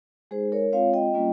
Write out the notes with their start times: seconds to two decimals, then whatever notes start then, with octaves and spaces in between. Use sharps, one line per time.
0.31 G#3 D#4 G#4 C5
0.52 A#4 C#5
0.72 G#3 C4 F4 C#5 F5
0.94 D#5 G5
1.14 G3 A#3 C#4 F4